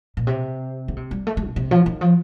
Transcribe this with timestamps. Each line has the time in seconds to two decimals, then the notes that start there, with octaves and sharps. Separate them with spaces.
0.17 A#2
0.27 C3
0.88 D3
0.97 C3
1.11 G3
1.27 A3
1.37 A3
1.46 C3
1.56 C3
1.71 F3
1.86 D#3
2.01 F3